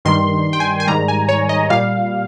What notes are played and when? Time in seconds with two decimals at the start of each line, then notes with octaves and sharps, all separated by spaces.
0.05 G2 D#3 G3 C6
0.53 G5
0.60 G#5
0.80 G#5
0.87 G#2 D#3 G3 A#5
1.08 G#5
1.29 C#5
1.49 D#5
1.70 A#2 G3 F5